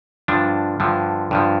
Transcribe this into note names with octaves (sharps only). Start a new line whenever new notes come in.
G2 D3 F3 D4
G2 D3 F3
G2 D3 F3